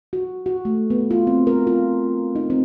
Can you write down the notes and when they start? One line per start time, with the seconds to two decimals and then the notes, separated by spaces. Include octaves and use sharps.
0.13 F#4
0.46 F#4
0.65 A3
0.90 B3
1.11 F4
1.27 C4
1.47 A#4
1.67 F4
2.35 D#4
2.50 C4